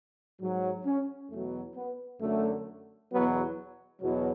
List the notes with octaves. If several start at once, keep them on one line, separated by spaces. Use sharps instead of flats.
G#2 F#3
C#4
E2 B2 F#3 A3
B3
F#2 D3 F#3 A3
E2 B2 F#3 B3
E2 B2 F#3